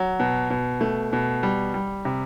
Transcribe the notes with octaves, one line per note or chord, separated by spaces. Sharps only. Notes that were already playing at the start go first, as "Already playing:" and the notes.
Already playing: F#3
B2
B2
A3
B2
G3
G3
C3